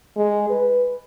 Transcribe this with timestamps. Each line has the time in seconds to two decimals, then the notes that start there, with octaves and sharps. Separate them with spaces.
0.16 G#3
0.50 B4